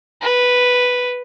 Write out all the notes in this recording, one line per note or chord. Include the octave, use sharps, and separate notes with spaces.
B4